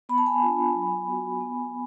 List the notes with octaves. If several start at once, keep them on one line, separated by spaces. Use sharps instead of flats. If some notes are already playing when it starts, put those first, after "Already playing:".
B3 B5
A5
G#5 B5
D4 F4
F#3
B3 F#4
B3